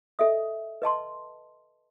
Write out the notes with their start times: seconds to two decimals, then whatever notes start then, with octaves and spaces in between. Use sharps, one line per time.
0.19 A4 D#5 E5 D#6
0.82 B4 D#5 A5 C6